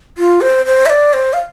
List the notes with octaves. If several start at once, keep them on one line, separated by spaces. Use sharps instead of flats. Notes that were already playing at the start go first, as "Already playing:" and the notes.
F4
C5
C5
E5
D5
C5
F5